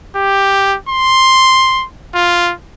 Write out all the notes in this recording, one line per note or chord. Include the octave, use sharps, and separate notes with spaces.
G4
C6
F4